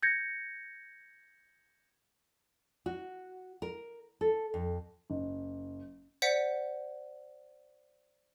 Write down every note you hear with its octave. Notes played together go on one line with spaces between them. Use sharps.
G6 G#6 A#6 C#7
F#4
A#4
A4
F2
F#1
C5 D5 F#5 B6 C#7